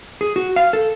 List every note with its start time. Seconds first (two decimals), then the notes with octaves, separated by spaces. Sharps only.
0.21 G#4
0.36 F#4
0.56 F5
0.73 A4